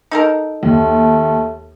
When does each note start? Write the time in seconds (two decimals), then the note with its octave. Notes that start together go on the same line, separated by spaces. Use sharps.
0.11 D#4 A4 A#4
0.63 D#2 A3